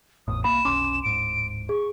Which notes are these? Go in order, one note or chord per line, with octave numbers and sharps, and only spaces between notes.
G#1 E2 A2 D#6
C2 F#2 A#3 B5 E7
F1 B1 C#4 C6 D6
D1 G#2 D7
G#4 C#6